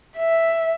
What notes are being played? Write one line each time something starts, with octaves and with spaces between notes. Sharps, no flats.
E5